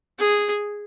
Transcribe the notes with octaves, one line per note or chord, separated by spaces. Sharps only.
G#4